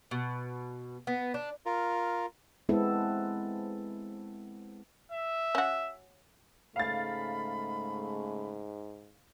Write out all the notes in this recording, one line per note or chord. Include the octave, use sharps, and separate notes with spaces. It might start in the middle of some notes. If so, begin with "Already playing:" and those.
B2
B3
D4
F4 A#4
G#3 B3 C4 E4 A4
E5
C#4 F#4
G#2 C#3 G#3 A3 F5 B5 A6